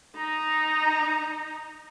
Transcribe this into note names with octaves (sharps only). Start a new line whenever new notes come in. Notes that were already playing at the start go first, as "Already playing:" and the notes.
D#4 A#5